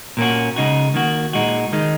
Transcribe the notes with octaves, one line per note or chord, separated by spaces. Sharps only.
A#2 A#3 C#4 F#4
C#3 G#3 D#4 F#4
D#3 A#3 F#4
A#2 G#3 D#4 F#4
D#3 G#3 D#4